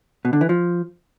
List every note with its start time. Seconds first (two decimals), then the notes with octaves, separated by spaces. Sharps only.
0.25 B2
0.33 D3
0.41 E3
0.49 F3